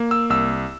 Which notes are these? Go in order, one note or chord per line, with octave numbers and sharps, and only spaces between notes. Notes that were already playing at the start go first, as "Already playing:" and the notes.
Already playing: A#3
E6
C2 E6